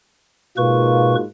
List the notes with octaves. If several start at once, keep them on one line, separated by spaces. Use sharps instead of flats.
G#2 B2 A#3 F4 B4 C#6